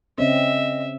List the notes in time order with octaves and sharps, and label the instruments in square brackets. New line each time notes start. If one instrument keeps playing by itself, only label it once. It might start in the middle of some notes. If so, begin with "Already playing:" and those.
[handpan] C#3 C4 C#4 [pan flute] D#5 [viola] E5